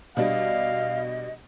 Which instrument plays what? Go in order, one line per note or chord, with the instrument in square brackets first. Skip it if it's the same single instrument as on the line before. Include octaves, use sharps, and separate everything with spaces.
[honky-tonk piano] B2 G3 D4 [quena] D#5 [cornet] F5